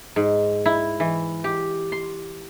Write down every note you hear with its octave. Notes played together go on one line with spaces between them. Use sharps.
G#2
E4
E3
G4
C6